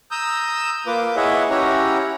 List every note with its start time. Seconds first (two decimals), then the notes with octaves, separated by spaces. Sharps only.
0.11 A#5 D#6 E6 G6
0.87 A#3 F4 B4 D6
1.16 E4 G#4 C#5 D#5 E5 F#5
1.50 C#4 E4 G4 C#5 F#5 A#5